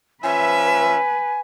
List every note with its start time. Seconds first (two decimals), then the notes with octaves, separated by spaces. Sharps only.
0.23 F3 C#4 B4 E5 G#5